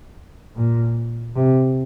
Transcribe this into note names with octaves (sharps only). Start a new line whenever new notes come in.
A#2
C3